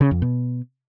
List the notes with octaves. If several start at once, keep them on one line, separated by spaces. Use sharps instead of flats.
C#3
F2
B2